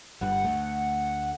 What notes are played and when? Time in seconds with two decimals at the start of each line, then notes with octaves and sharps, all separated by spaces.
0.21 G1 G2 G3 F#5
0.44 D2 A3